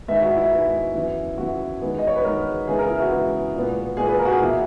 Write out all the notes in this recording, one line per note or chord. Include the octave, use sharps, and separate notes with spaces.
G#2 D#3 G#3 B3 E5
F#4
E4
G#2 D#3 G#3 B3
F#2 E3 B3
F#2 E3 B3 F#4
E2 D#3 G#3 B3
D#5
C#5
B4
E2 D#3 G#3 B3 A#4
C#3 E3 G#3 B3 G#4
A#4
E4
F#4
C#3 E3 G#3 B3
A#2 G#3 B3
A#2 G#3 B3 G#4
B4
A#4
F#4
G#4
E2 B2 A#3 E4